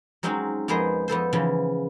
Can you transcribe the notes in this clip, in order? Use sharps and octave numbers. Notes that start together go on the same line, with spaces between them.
F#3 G#3 C4 C#4 D#4 F#4
F2 G#3 B3 G#4 A#4 C5
F2 B3 A4 C5
C#3 E3 F3